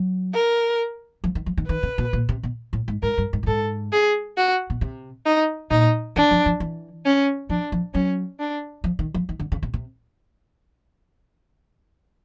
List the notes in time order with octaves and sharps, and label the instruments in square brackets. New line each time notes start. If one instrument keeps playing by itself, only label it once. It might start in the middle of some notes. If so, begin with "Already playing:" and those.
Already playing: [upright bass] F#3
[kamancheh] A#4
[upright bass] F3
D#3
F3
D#3
[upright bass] D#3 [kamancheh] B4
[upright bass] C#3
B2
A#2
C3
B2
A2
G#2
[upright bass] G#2 [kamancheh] A#4
[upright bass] G2
G#2
A2
[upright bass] G#2 [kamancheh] A4
[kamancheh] G#4
F#4
[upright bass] B2
C3
[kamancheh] D#4
[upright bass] A#2 [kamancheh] D#4
[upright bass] E3 [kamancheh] D4
[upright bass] F3
F3
E3
[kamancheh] C#4
[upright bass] F3 [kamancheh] D4
[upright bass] F3
[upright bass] F#3 [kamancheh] C#4
[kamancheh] D4
[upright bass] F3
D#3
F3
D#3
D3
C#3
C3
C3